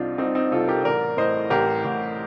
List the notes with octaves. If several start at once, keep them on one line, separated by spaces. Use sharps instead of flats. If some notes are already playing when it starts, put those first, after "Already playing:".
Already playing: C2 C3 C4 D4 D#4 F4
C2 C4 D#4
C4 D#4
C2 F4 A4
G4 A#4
A1 A#4 D5
A2 C5 D#5
A1 G4 A#4
A1